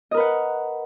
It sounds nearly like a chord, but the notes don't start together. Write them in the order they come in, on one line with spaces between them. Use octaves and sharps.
D#5 A#4 B4 F#5